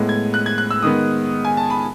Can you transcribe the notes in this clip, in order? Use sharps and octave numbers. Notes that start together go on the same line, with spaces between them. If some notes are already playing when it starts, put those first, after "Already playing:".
Already playing: A2 G#3 B3
G#6
F#6
G#6
F#6
E6
D#3 G#3 B3 D#6
G#5
A5
B5